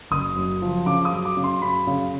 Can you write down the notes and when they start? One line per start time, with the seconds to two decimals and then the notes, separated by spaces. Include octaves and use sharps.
0.11 F#1 D#6
0.36 F#2
0.62 F3
0.86 C#3 D6
1.05 D#6
1.12 F#2
1.25 D6
1.37 C#3
1.44 C6
1.62 F#2 B5
1.87 C#3